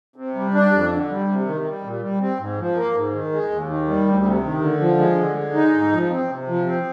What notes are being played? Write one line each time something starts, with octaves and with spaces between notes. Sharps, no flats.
C3
G3
D4
F2
D3
G3
C3
D#3
G3
A#2
G3
C4
G#2
F3
A#3
G#2
D#3
G#3
D#2
D#3
G3
D2
C3
D#3
D3
F3
G#3
D3
G#3
D#4
G#2
F3
C4
C3
F3
C4